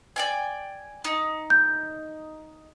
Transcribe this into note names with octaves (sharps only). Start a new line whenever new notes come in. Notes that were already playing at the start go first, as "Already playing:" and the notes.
D5 G5 G#5
D#4
G6